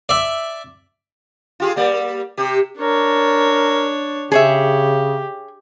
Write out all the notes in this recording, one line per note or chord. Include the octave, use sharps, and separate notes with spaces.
D5 E5
F4 G4 G#4
G3 A#3 D5
C3 G4
D4 A#4 C#5
C#3 G4 G#4 C#5 E5